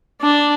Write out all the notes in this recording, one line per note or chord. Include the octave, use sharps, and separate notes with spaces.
D4